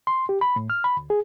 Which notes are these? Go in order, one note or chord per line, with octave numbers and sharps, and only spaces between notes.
C6
G4
B5
A2
F6
B5
D2
G#4